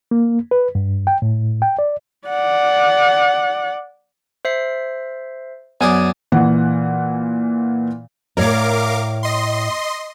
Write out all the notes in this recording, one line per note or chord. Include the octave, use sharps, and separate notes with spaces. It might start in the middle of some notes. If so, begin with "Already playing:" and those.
A#3
B4
G2
G5
A2
G5
D5
D5 F#5
C5 E5 C7
F#2 B3 G#4 D5 G#5
A#2 E3 F#5
A2 A#4 C#5 D5 F5 D6
D#5 C6